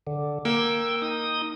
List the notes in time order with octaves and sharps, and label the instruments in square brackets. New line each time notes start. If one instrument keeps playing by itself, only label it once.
[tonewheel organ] D3
[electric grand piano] A#3 [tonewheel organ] G5 E6
[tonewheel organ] D#4 D#6